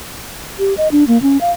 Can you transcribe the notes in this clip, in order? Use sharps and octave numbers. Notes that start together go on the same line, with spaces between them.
G4
D#5
D4
A#3
C#4
F5